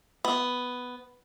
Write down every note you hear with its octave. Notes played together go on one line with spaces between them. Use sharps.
B3